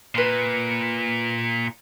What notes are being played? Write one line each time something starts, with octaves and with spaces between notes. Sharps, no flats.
A#2 B4 C6